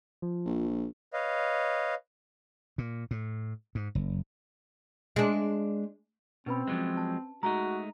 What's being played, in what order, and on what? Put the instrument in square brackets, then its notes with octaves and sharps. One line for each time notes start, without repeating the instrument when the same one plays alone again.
[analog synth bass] F3
[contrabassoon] A#1
[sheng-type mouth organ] B4 C#5 D#5 F5
[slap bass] A#2
A2
G#2
F#1
[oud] G#3 D4
[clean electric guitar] B2 [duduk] C4 [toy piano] C#4 B4 B5
[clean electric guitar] F3 F#3 G#3
[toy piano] A5
[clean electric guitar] G#3 A3 D#4 [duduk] F#4 [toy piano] A#5